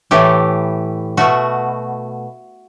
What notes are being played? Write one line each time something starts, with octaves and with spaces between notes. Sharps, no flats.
A2 E3 A3 G4
B2 A3 F#4